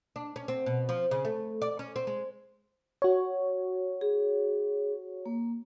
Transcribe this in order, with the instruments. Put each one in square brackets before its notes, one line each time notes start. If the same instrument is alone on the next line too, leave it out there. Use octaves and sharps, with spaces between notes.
[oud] D4
C#4
C4
B2
F3
C#3
A3
D5
C#4
C4
G#3
[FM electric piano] F#4 C#5
[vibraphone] G#4
A#3